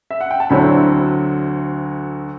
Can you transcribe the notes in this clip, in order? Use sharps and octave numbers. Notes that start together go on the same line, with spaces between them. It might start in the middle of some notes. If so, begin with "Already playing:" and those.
E5
F#5
G5
A5
D2 D3 F#3 C4 E4 B5